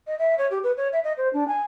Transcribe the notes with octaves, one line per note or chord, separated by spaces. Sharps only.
D#5
E5
C#5
G4
B4
C#5
E5
D#5
C5
D4
G#5